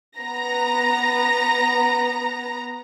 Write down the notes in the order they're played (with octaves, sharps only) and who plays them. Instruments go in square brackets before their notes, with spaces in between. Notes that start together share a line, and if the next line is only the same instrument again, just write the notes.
[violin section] B3 A#5 A#6